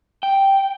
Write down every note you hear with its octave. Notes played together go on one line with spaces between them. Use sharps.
G5